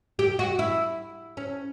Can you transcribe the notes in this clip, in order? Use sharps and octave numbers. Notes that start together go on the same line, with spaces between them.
G4
F#4
E4
C#4